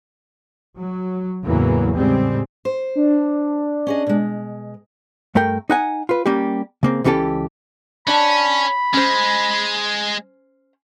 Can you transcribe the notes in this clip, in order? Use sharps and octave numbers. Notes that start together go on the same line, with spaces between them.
F#3
E2 A2 C#3 E3 F#3 A#3
A2 C#3 G3 G#3 C4
C5
D4
C#4 G#4 D#5
B2 G#3
G2 A3 A#4 G5
D#4 F#5 G#5
F4 B4
G3 A#3 C#4 G4
C#3 A#3 C4
C#2 E3 C#4 G4 A4 A5
C#4 D4 D5 A5 B5
G#3 C#4 C5